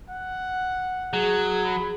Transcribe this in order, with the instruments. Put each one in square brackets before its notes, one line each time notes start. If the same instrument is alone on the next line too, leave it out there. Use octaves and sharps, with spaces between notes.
[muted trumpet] F#5
[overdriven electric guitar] F#3 [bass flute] G#4
[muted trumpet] B5